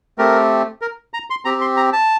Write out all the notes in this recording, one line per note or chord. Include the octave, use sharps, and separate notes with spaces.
A3 C4 G4 A#4
A#4
A#5
C6
C4 G4 A#5
C6
A#5
A5